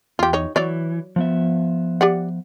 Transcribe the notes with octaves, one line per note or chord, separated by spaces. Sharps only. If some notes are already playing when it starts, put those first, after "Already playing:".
E2 F4 G4
D#4 C#5
E3 F#3 C#5 D5
F3 B3 E5
G4 D5 F#5